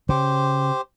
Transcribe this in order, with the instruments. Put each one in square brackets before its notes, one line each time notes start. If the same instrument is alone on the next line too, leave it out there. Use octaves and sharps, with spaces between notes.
[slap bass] C#3 [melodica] G4 C5